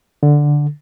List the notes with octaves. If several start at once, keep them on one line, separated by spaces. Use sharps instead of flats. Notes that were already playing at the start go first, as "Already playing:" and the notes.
D3